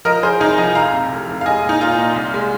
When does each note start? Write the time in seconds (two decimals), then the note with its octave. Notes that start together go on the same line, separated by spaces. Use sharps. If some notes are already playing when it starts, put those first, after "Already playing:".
0.05 F3 A#4 D#5
0.23 F3 G#4 C5
0.40 C2 D#4 G#4
0.58 F3 D#5 G#5
0.75 F1 F5 A#5
0.93 C3
1.11 F1
1.28 F1
1.41 F5
1.46 G#3 D#5 G#5
1.63 A#2
1.69 D#4
1.80 A#2 F4
1.98 A#2
2.16 C2
2.34 G#3